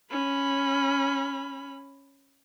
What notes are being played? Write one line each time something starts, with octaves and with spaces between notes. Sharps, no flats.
C#4 B5